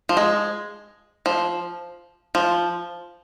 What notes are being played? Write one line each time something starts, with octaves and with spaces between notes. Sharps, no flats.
F3
G#3
F3
F3